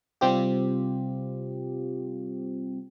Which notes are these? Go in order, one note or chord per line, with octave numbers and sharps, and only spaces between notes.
C3 G3 C4 F4 G4